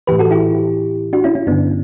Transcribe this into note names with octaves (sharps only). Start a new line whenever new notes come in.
A2 E3 G4 B4
F#4 A4
E4 G4
D4 F#4
C#4 E4
C#4 E4
G2 D3 B3 D4